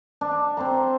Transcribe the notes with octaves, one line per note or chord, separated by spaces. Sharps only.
D4
C4 C5 A5 A#5